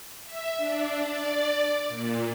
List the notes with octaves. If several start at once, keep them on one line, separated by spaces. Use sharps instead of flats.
E5
D4
D5
A#2